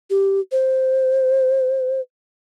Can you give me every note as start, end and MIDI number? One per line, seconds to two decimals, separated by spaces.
0.10 0.40 67
0.52 2.01 72